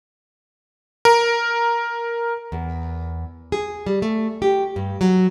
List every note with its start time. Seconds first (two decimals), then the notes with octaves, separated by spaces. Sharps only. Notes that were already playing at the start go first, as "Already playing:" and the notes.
1.05 A#4
2.52 E2
3.52 G#4
3.87 G3
4.02 A3
4.42 G4
4.76 G2
5.01 F#3